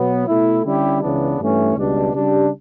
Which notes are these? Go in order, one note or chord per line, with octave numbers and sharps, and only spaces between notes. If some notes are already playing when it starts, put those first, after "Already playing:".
Already playing: B2 F#3 B3
B2 A3 E4
D3 G3 C#4 E4 G4
C#2 C#3 E3 B3 D4
G2 E3 A3 C#4
C#2 B2 G3 D4
C#3 G3 D4 G4